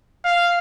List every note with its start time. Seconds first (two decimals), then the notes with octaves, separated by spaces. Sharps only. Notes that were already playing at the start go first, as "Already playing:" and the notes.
0.25 F5